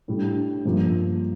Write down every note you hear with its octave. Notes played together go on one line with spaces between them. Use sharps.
A2 G3 D4
G2 F3 A#3